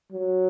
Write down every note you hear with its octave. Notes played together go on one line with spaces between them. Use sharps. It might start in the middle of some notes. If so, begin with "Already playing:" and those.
F#3